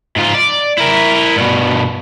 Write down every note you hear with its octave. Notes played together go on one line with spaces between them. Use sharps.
G#2 F4
D5
E4 A#4
G2 B2